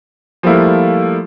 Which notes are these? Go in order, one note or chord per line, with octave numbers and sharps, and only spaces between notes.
F3 G3 A3 A#3 E4 F4